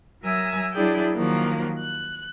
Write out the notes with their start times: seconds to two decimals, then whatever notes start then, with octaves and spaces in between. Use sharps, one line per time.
0.22 F#3 A#4 E5 G#5 D#6 E6
0.73 F#3 D4 E4 G#4 D5 G5
1.15 D#3 F3 F#3 A#3
1.81 F#6